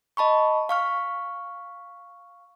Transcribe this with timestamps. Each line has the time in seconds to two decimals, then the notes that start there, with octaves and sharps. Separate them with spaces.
0.17 D#5 A5 B5 C#6
0.69 F5 C#6 F6